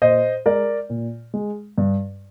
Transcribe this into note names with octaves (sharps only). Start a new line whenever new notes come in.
A#2 C5 D#5
G#3 A#4 D5
A#2
G#3
G2